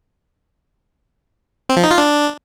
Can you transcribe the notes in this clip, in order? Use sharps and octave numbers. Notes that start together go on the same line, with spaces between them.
C4
F3
D#4
F4
D4